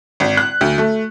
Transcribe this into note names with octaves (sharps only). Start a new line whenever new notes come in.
G#1
F#6
D2
A3